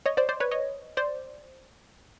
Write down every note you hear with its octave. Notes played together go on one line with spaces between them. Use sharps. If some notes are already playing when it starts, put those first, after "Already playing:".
C#5 D#5
C5 D5
C5 D5
B4 C#5
C#5 D#5
C5 D5